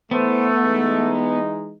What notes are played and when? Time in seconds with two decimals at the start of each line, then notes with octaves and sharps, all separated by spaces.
0.11 E3 A3 B3 C5
0.63 E3 G#3 D#4